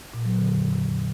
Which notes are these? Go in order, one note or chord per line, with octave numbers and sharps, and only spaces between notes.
A#2
F#3
D3
F2